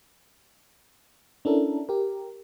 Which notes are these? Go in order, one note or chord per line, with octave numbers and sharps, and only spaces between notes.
C#4 D4 E4 A4 A#4
G4 A#4